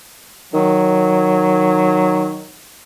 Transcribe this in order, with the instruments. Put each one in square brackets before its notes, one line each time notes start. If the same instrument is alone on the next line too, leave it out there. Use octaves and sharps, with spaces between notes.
[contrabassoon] D#3 [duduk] F#3